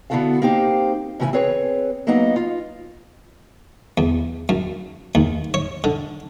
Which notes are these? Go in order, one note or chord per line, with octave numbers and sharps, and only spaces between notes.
D3 B3 E4 F#4 A4 F5
A#3 C4 D#4 G4 C5
A2 C#3 E3 A#4 G#5
C4 G#4 B4 C#5
F#3 A#3 B3 D#4 D#5 F#5
F4
E2
F#2
D#2
C#5
D3